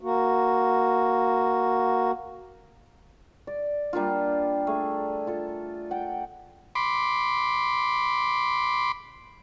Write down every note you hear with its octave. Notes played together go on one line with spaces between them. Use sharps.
A#3 F#4
D5
G3 A#3 D4 F4
A3 G#4
F4 A4
F#5 G5
B5 C6 D6